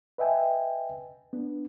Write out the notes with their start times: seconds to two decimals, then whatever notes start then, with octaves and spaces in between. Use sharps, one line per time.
0.18 B4 D#5 E5 G5 G#5
1.33 B3 D4